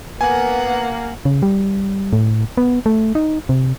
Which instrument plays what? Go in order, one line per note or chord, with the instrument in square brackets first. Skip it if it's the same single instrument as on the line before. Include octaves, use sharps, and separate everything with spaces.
[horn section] A#3 [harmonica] B3 [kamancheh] F#5 [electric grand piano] G#5
[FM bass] C#3
G3
A2
B3
A3
D#4
C3